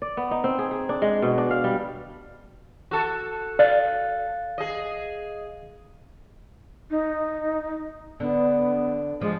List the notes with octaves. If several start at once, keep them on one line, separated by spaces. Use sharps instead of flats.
D5
B3
D#4
C4
G#4
G#4
D4
G#3
B2
D4
F5
G3
F#4 A4
D5 F5 F#6 A6
G#4 D#5
D#4
D3 B3
F3 G#3